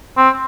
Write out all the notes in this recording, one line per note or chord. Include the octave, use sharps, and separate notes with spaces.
C4